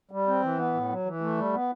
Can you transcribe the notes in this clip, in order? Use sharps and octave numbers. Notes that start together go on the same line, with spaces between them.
G3
C4
E3
B3
A2
F#3
E3
A3
G3
B3